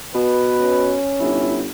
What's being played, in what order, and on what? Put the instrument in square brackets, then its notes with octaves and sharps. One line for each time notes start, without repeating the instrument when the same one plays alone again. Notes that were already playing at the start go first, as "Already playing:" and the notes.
[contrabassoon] B2 [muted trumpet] B4
[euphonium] C#4
[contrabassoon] G1 [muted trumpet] E4